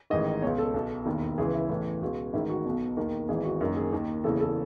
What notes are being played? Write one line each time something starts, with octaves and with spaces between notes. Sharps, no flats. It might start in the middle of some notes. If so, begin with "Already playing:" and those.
A1 G#2 D#3 D#5
C#2 B2 C#5
A4
B1 B2
E1 D#2 D#3
C#2 C#3 E3 G#4
E4
A1 A2 E3
C#2 B2 F#4
A1 G#2 D#3 E4
F#4
B1 B2
E1 D#2 D#3
G#1 G#2 E3 G#4
F#4
F#1 F#2 D#3 F#4
G#4
D#2 D#3
F#1 E2 C#3 E3 A4
A4